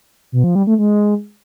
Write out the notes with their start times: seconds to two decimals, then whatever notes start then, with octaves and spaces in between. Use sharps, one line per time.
0.32 B2
0.44 F3
0.55 G3
0.67 A3
0.79 G#3